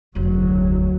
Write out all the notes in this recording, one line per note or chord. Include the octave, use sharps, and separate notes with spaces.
F1 D2 F#3